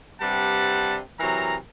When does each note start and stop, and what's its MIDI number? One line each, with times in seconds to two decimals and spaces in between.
0.21 0.99 48
0.21 0.99 55
0.21 0.99 62
0.21 0.99 71
0.21 0.99 78
0.21 0.99 81
1.20 1.56 48
1.20 1.56 52
1.20 1.56 54
1.20 1.56 70
1.20 1.56 82